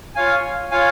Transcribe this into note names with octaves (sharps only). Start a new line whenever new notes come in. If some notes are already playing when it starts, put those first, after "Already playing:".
F4 C#5 F5 G#5
F4 C#5 F5 G#5